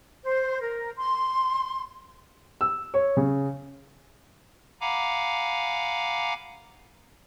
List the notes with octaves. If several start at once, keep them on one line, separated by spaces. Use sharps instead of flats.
C5
A#4
C6
E6
C#5
C#3
F5 F#5 G#5 A#5 B5 D6